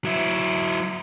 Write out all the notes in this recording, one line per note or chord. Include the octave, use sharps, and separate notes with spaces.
F#3 E4